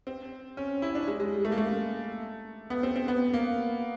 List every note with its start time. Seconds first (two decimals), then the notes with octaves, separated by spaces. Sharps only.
0.07 C4
0.57 C#4
0.82 E4
0.95 D4
1.07 G#3
1.20 G#3
1.32 G3
1.45 A3
1.52 A#3
1.57 A3
2.70 B3
2.83 C4
2.96 C4
3.08 B3
3.33 A#3